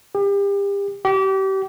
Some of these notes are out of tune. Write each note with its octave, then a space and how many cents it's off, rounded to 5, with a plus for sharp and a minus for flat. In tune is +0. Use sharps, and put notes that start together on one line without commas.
G4 +35
G4 -30